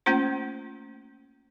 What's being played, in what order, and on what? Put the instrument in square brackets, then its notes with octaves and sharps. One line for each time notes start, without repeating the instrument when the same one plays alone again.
[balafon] A3 A#3 C#4 F4 C5